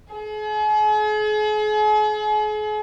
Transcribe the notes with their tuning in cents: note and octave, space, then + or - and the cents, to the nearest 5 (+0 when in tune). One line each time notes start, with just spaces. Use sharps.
G#4 +40